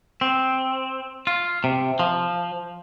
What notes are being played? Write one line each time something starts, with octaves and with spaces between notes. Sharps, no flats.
C4
F4
C3
F3